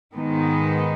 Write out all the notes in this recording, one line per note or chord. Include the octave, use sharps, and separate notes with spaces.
G#2 D#3 G#3 B3 D#4